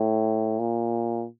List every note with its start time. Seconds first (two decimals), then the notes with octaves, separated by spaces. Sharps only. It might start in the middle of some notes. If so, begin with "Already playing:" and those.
Already playing: A2
0.59 A#2